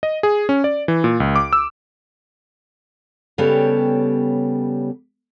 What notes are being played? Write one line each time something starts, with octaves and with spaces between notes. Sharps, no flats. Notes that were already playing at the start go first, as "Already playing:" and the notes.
D#5
G#4
C#4
D5
E3
A#2
C#2
D6
E6
C#3 G3 B3 G4 A4 C#5